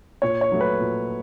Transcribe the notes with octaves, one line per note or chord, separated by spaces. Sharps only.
A#2 C#5
C#5
F#3 A3
B4
A#2